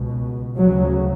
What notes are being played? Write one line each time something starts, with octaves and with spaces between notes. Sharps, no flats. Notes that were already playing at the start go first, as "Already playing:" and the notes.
Already playing: C#2 B2
D2 C#3 F#3